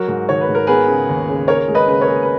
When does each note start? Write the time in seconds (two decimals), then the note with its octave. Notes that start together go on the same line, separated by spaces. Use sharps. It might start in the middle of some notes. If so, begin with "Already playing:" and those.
Already playing: F#3 F#4 A#4
0.08 G#2
0.29 D#3 C#5
0.41 B4
0.49 G#2
0.55 A#4
0.67 B3 G#4 B4
0.88 C#3
1.09 D#2
1.28 C#3
1.48 G#4 A#4 C#5
1.68 G#3
1.75 B4 D#5
1.88 C#3 B4
2.01 A#4 C#5
2.08 G#4
2.23 B4